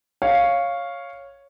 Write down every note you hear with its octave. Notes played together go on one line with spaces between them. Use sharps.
C#5 F5